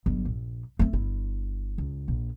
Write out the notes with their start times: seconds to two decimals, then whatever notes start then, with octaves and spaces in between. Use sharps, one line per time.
0.06 G1 F#3
0.26 A#1
0.79 A3 C4
0.93 G1 E4
1.78 C#2
2.08 A#1